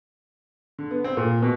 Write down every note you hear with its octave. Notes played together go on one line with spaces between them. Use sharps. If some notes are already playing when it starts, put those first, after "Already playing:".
D3
B3
C4
A#2
B2